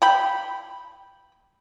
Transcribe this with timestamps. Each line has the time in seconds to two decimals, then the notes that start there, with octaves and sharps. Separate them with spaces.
0.02 G5 B5